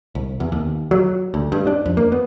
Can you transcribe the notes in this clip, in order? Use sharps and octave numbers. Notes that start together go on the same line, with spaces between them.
C2
E2
D#2
F#3
D2
G2
D4
F2
A#3
B3